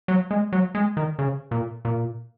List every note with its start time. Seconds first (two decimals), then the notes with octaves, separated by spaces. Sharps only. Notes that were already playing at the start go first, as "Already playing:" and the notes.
0.08 F#3
0.31 G#3
0.53 F#3
0.75 G#3
0.97 D#3
1.19 C#3
1.51 A#2
1.85 A#2